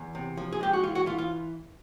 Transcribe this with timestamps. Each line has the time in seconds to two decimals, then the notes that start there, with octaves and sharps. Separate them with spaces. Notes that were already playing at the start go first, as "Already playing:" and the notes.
Already playing: E2
0.15 C3
0.37 F3
0.52 G#4
0.61 G#3 G4
0.73 F#4
0.83 E3 F4
0.95 F#4
1.06 E3 F4
1.18 F4